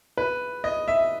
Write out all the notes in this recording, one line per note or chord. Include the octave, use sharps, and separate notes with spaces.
B4
D#5
E5